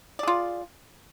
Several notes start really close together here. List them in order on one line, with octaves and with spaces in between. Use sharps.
D5 G#4 F4